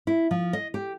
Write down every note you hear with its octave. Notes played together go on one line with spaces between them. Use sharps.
E4
F3
D#5
G4